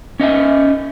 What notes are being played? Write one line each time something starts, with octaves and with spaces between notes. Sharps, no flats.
C#4 D#5 E5 G#5